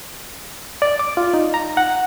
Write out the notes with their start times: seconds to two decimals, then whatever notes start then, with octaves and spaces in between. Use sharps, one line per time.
0.82 D5
0.99 D6
1.17 F4
1.34 D#4
1.54 A#5
1.77 F#5